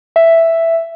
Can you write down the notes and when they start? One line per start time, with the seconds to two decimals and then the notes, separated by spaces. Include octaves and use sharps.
0.16 E5